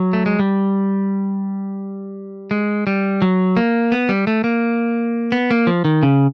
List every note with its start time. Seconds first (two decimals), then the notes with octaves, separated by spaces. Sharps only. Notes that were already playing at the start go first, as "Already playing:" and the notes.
Already playing: F#3
0.13 A3
0.26 G#3
0.39 G3
2.51 G#3
2.87 G3
3.22 F#3
3.57 A#3
3.92 B3
4.09 G3
4.27 A3
4.44 A#3
5.32 B3
5.51 A#3
5.67 F3
5.85 D#3
6.03 C#3